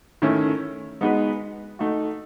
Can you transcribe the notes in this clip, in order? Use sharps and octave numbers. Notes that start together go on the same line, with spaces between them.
D#3 A3 C#4 E4
G#3 B3 D#4 F#4 B4
A3 D#4 F#4